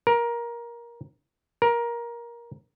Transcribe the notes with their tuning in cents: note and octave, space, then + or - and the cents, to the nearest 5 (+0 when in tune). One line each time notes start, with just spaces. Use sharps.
A#4 +20
A#4 +20